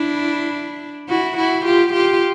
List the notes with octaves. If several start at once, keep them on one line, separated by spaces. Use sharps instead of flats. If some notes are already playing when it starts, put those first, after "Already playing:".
Already playing: D4 E4
E4 F#4
E4 F#4
F4 G4
F4 G4